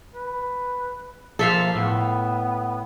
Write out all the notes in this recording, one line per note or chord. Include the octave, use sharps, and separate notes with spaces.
B4
F3 A#3 A4 E5 F5
A2 B3